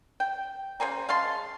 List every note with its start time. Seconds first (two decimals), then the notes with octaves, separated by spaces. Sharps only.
0.20 G5
0.80 C#3 C5 G#5 A#5
1.09 G#3 F5 A5 C6